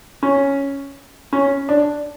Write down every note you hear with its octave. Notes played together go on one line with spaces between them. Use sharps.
C#4
C#4
D4